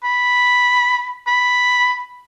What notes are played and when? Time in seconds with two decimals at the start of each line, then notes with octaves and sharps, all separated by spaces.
0.04 B5
1.27 B5